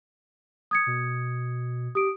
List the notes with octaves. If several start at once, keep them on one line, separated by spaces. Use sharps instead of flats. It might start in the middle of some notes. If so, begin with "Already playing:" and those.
D#6 G#6 C#7
B2
G4 D#6 D7